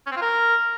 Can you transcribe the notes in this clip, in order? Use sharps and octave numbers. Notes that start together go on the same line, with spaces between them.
C#4
C4
F4
A#4